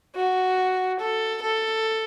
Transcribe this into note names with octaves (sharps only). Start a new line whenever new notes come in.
F#4
A4
A4